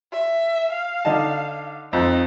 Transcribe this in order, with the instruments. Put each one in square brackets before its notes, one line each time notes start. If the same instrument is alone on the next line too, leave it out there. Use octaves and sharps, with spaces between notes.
[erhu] E5
F5
[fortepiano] D3 D#4 A5
[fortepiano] F2 [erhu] D#4